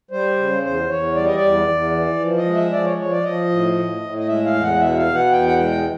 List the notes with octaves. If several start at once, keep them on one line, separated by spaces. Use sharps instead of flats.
G3 C5
C#3
E2 C5
E2 C#5
G3 D5
D#5
D5
E2
E2
E3
F3
D#5
G#3
E5
F3 D5
C#5
F3 C#5
D5
F3 D#5
A2
A2
A2
D#5
G#3 E5
F5
E2
F#5
B2 E5
F5
B2
F#5
E2 G5
F#5
G#3 G5